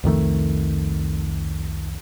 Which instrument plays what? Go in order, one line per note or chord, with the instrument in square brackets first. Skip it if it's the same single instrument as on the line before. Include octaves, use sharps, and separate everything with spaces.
[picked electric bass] C2 F2 D#3 A3